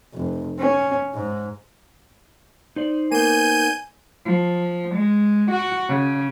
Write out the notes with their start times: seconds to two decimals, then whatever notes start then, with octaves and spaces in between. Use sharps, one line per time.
0.15 F1
0.58 C#4
1.14 G#2
2.76 D#4 C5 D5
3.12 A#3 B3 G#5 G6 D#7
4.25 F3
4.94 G#3
5.49 F#4
5.89 C#3